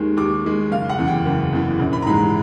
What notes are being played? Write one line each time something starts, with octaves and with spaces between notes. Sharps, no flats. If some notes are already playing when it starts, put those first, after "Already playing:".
Already playing: D#2 D#3 G#3
D#2 D6
D#3 G#3
F#1 F5
F#5
E2 C#3 E3
G5
F#1
E2 C#3 E3
A#1
B5
A#5
G#2 E3 G#3 B5